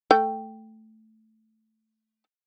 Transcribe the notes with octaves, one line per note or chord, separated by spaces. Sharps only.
A3 G5